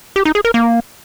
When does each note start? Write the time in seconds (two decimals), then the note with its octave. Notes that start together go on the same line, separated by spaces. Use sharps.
0.16 G4
0.25 D#4
0.35 G#4
0.45 A#4
0.54 A#3